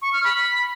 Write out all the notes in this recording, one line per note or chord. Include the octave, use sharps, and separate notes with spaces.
C#6
F6
B5